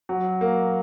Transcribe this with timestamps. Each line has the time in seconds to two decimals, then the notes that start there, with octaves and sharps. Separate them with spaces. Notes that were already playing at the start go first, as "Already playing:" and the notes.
0.09 F#3
0.41 A#3